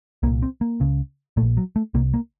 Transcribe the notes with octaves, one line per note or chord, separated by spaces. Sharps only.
C2 A#2 A#3
C4
A#3
C#2 C#3
A#1 A#2 A3
F#3
A3
C2 C3 A#3
A#3